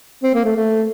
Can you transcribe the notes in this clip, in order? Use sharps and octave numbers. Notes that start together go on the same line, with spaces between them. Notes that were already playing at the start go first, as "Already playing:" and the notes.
C4
A#3
A3
A3